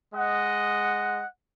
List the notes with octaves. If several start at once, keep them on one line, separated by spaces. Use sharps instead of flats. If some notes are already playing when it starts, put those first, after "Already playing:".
G#3 D#5 F#5